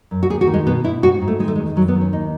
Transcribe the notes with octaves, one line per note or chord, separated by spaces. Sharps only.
F#2
F#4
D#2 G#4
F#4
D#3
G#3
B2 B3
B2 E4
G#2 F#4
G#2
A3
D#3 G#3
A3
E2 G#3
F#2 F#3
B3
D#3
C#4
D#2 D#4